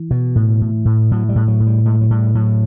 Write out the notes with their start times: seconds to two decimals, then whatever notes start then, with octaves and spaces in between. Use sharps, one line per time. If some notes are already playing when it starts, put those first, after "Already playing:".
Already playing: E3
0.11 B2
0.36 A2
0.61 A2
0.85 A2
1.11 A2 F#3
1.29 G3
1.36 A2
1.48 F#3
1.60 A2
1.67 G3
1.85 A2 G#3
2.01 F#3
2.10 A2 G3
2.35 A2 F#3